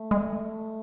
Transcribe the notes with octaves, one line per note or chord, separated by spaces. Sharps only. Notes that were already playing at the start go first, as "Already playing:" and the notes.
Already playing: A3
G#3